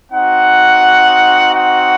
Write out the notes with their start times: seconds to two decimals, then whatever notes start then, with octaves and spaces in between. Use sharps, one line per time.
0.11 C4 D#4 F#4 F#5
1.53 F#5